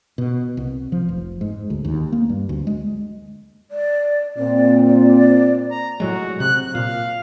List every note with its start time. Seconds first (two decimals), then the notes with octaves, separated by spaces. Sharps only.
0.18 B2
0.57 C2
0.92 F3
1.09 F1
1.41 G#2
1.70 D2
1.85 D#2
2.12 A#3
2.29 G2
2.49 D2
2.67 G#3
3.71 D5
4.38 A#2 C4 D5
4.86 D5
5.71 A#5
6.00 A2 F#3 G#3 F#4
6.40 C3 F#6
6.75 A#2 F5